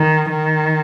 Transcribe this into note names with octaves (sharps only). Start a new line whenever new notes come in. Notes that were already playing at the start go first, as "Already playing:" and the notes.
Already playing: D#3
D#3